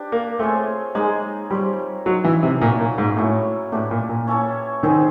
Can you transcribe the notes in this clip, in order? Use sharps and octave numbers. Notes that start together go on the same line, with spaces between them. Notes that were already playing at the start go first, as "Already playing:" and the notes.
Already playing: D4 G4 B4
A#3
A3 C4 F4 G#4 C#5
G#3 A#3 D#4 G#4
G3 C4 F4 A#4 C#5
F#3 B3 D#4 F#4
E3
C3
A#2 A#3 C#4 F#4
A#2
G#2
A2 F#3 A#3 C#4 E4
A2 D4 G4 B4
A#2
A#2
C#4 E4 A4 C#5
D#3 C4 E4 G#4 C5